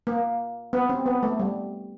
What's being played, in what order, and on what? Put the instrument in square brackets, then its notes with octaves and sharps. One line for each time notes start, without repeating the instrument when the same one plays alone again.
[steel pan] A#3
B3
C4
B3
A3
G3